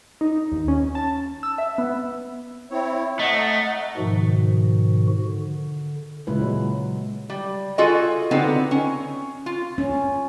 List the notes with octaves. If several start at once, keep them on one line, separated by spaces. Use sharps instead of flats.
D#4
D#2
C#4
A5
E6
E5
B3
C4 E4 C#5
A3 D#5 F#5 A#5
G#2 B2 D#3 F3 F#4
D3
A#2 C#3 G#3 E4 B4
F#3
G3
F4 F#4 G#4 A4 D#5
D3 B3 C4 D#4
C#4
F4
C#4